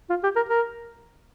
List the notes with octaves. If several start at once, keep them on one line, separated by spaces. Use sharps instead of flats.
F4
G4
A#4
A#4